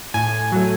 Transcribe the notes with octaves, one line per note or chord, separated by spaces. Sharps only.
A2 G#5
F#3 A3